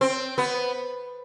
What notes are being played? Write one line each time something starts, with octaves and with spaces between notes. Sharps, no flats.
C4
B3